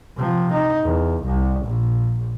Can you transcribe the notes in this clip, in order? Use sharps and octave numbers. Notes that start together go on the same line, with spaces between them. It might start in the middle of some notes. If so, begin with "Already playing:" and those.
C3 F3
D#4
E2
C2
A#1